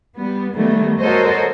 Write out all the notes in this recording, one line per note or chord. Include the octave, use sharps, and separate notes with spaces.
G3 B3
D#3 F#3 G3 A3 B3
F#4 A4 A#4 C5 C#5 D#5